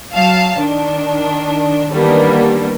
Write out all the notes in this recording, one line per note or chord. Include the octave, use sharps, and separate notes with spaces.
F#3 F5 A5
D#3 D4
D#3 E3 G3 A#3 B3 D4